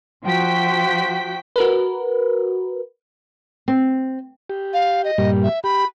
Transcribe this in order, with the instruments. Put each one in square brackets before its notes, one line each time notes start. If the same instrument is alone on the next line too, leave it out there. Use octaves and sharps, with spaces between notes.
[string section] F3 F#4 G5 B6
[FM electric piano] F#4 A#4 B4
[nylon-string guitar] C4
[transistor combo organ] G4
[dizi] F5
D#5
[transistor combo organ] G2 A#2 G3
[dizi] E5
[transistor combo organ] G4 [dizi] B5